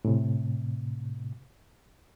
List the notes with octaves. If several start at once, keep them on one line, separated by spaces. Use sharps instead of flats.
A2 C3